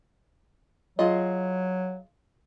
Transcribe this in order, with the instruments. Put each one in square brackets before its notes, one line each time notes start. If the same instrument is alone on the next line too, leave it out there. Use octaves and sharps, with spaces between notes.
[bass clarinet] F#3 [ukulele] F4 [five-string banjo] G#4 D#5